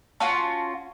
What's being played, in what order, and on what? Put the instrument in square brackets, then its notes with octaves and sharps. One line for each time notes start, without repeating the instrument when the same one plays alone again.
[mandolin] C#4 F4 F#4 [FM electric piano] A5